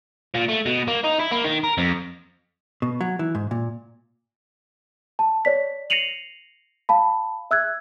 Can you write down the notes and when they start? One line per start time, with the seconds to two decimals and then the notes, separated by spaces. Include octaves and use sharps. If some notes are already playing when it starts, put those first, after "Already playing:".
0.34 A#2
0.48 A3
0.66 B2
0.88 A#3
1.04 D#4
1.20 E4
1.32 A#3
1.44 D#3
1.64 A#4
1.78 F2
2.82 B2
3.01 F#3
3.19 E3
3.35 G#2
3.51 A#2
5.19 A5
5.45 C#5 D5 B6
5.90 A#6 C7 C#7 D#7 F7 F#7
6.89 F5 A5 B5
7.51 E5 E6 F#6 G#6